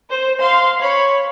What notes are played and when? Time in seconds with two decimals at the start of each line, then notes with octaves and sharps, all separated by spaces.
0.10 C5
0.40 F5 C6
0.80 C#5 B5